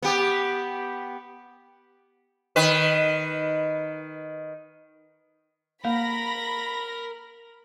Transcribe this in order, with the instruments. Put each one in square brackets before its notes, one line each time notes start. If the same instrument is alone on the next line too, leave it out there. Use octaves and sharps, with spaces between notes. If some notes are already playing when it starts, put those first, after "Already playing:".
[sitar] B3 G4
D#3 B4
[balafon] A#3 [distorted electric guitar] A#4 [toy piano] F5 [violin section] B5 A#6